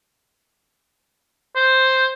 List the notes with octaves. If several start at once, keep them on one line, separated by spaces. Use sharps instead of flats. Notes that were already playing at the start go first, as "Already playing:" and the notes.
C5